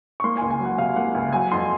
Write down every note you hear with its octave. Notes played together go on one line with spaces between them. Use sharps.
C#6
A#3 C6
G#5
C#2
G#5
F#3
F#5
C3 F5
A#3 F#5
C#2 G#5
F#3 G#5
F2 C6